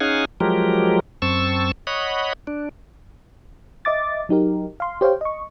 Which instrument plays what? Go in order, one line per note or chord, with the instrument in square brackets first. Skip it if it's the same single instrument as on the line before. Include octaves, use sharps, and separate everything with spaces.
[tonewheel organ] C#4 D#4 G#4 F5 F#5 G#5
F3 F#3 G#3 G4 A#4
F#2 C4 A5 C#6 E6
C#5 D#5 F#5 B5
D4
[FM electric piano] D#5 E5 D6 A6
F#3 D#4 G4 A#4
F5 C6
G4 C5 C#5 F5 G5
D#5 C#6